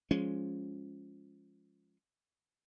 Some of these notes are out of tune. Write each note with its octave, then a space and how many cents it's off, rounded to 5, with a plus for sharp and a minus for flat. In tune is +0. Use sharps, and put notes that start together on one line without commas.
F3 +0 G#3 +0 C#4 +0